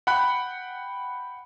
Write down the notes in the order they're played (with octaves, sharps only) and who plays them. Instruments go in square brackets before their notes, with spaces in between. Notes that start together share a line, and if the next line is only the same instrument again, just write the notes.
[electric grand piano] F#5 G5 B5 F#6